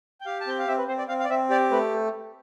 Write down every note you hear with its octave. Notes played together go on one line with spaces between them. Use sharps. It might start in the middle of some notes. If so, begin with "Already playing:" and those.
G5
G4 F5
A5
C4 G5
F5
C4 E5
B4
C4 C5
D5
C4 F5
F5
D5
C4 E5
G4 D5
A3 B4